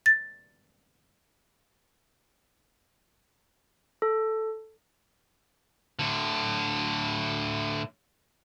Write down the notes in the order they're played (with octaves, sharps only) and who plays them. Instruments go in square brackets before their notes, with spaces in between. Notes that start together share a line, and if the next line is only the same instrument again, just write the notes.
[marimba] A6
[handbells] A4
[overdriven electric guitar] A2 D3